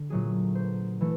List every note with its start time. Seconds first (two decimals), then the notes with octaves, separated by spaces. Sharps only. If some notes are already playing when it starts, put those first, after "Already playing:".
Already playing: D3
0.10 A#2 F#3 A3 G#4
0.55 C5
1.01 E3 A3